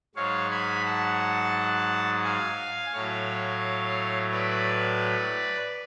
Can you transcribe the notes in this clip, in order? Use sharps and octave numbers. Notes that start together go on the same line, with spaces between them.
G#2 F#3 C#5 F5
G#5 B5
F#5 A5
F5 G#5
A2 F#3 C#5 F5
B4 D5